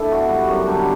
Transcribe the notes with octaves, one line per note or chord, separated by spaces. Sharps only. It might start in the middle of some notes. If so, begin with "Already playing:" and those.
Already playing: A3 D4 E4 A4
B2 F#4
G3
F#2 F#4
D3 G3